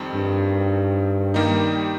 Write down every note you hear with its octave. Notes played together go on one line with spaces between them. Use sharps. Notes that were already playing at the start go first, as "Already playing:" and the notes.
Already playing: F2 D#3 G3 C4
G2
D#3 G3 A#3 D#4